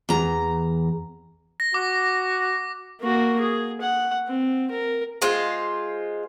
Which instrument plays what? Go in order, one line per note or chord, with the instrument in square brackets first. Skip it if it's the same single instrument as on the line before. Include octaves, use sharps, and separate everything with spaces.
[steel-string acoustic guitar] E2 A#5
[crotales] A#6
[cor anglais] F#4 [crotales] D6
[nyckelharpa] A#3 F#4
G#4
F#5
C4
A#4
[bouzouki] G#3 F4 C5